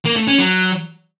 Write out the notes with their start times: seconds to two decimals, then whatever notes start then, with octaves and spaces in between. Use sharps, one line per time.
0.05 A#3
0.16 A3
0.28 C#4
0.39 F#3